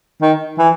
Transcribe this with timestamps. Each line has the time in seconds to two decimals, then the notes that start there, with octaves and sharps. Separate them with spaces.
0.21 D#3
0.58 E3